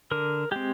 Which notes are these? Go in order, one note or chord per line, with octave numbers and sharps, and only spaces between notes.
D3 A#4
G#3 C4 G4